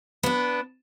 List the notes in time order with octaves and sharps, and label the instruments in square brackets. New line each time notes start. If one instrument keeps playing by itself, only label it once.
[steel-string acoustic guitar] B3 D4